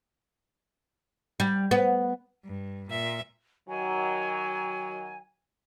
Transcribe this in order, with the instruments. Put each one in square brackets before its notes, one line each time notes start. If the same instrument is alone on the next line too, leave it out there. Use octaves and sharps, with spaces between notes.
[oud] G3
B3
[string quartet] G2
A#2 E5
[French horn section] D#3 F#3 [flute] G#5